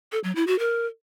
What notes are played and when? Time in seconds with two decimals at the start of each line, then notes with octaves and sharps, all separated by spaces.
0.12 A4
0.24 F#3
0.35 E4
0.47 F#4
0.59 A#4